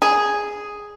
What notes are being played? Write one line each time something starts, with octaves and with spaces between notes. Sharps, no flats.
G#4